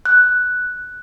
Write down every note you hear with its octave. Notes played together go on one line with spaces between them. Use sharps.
F#6